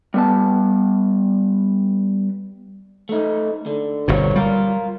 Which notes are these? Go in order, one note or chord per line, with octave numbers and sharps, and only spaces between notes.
G3 B3 A5
A3 D#4
D3
G1 B2 C4 F#4 C#5
G3 F4 A#4